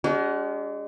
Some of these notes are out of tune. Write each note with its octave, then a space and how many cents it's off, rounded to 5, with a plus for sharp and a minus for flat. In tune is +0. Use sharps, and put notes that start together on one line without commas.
G#3 -20 D4 -45 F#4 +35